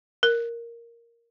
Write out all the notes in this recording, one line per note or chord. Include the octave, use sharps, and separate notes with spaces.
A#4